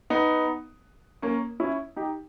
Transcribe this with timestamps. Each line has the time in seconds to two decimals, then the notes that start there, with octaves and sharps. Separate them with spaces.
0.10 B3 D#4
1.22 A#3 C#4
1.60 C#4 E4
1.96 D#4 G4